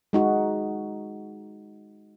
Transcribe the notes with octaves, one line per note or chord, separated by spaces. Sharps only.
G#3 D#4 F#4